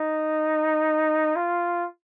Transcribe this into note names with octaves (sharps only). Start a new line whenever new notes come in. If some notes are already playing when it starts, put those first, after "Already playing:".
Already playing: D#4
F4